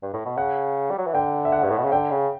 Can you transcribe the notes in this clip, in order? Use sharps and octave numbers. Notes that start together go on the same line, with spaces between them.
G2
A2
B2
C#3 F#5
G3
F#3
E3
D3 G5
E5
F#5
G2
A2
B2
C#3
D3 G5
C#3